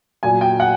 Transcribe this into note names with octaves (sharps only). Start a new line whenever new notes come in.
A#2 F#3 G#5
G5
F#5